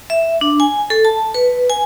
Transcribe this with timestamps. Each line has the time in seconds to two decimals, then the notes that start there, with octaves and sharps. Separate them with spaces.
0.10 E5
0.41 D4
0.60 G#5
0.90 A4
1.05 A5
1.34 B4
1.70 G#5